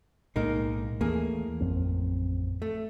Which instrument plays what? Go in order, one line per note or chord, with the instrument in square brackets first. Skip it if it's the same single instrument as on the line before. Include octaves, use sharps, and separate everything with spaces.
[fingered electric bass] B1 A2 G#3 [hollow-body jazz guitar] A#3 D#4 A#4
[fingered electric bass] D#2 E3 A3 [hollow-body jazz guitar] A#3 G#4
[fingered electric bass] A1 F2 C4
[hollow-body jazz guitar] A3